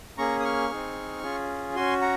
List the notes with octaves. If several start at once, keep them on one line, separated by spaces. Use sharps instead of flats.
A#3 C#4 G#4 A#5 C#6
D#6
C#6 F6
C4 D#4 G#4
C#4 F4 G#4
C#4 F#4 G#5 C6
F#5 A#5